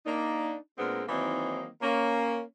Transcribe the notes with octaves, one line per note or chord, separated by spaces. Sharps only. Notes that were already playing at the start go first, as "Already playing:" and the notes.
A#3 D4 D#4
A#2 G#3 B3 C4 D4 A#4
D#3 E3 F#3 A#3 C4 D#4
A#3 C#4